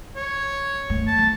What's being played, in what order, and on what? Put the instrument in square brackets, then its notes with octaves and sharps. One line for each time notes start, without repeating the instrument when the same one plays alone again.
[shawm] C#5
[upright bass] G2 A3
[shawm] A5
[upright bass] E3